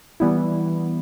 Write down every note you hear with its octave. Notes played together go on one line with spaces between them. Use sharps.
E3 G3 B3 E4